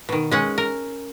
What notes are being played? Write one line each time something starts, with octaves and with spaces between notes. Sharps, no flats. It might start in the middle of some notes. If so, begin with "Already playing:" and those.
B2 D#3
G#3 C#4 F#5
A#4